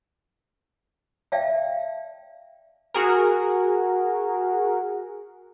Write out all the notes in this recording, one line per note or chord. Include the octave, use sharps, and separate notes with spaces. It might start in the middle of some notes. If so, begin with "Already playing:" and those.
D5 E5 F5 G5 A5
F#4 G#4 A#4